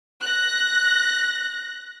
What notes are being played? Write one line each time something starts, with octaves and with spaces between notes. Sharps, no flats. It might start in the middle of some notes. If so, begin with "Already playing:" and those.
F#6 A#6